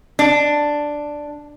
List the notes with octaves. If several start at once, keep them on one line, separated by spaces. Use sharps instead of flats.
D4